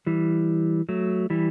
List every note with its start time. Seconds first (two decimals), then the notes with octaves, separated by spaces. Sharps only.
0.07 E3 G3
0.89 F#3 A3
1.30 E3 G3